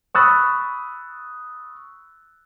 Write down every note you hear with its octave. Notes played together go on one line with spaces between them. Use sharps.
B5 C#6 D#6 E6 F#6 A6